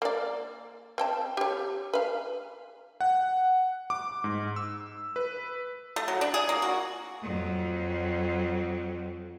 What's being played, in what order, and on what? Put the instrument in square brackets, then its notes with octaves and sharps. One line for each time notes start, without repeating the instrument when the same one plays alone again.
[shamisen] A#3 D5
C4 G5 A5
G4 C#5
B4 F5
[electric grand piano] F#5
D6
G#2
E6
B4
[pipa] A3
F#3
D4
G#4
A#3
F#4
[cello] F2 F#3